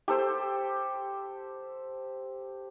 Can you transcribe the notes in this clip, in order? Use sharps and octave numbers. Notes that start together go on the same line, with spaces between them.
G4 A4 C5